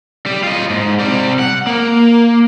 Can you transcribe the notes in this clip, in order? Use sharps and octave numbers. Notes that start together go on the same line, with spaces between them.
G3
F4 D#5
G#2
C3 G3
F#5
A#3